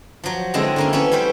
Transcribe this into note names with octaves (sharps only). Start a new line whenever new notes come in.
F3 F#3
D3 G#3 C4 D4 E4
D3 A#3 C#4
A3 B3 C#4 E4
G3 C#4 B4 C5 G5